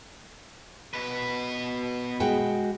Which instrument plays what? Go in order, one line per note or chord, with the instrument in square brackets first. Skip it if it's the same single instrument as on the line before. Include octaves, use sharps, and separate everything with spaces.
[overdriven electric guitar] B2 B4
[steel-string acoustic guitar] G#3 F#4 G5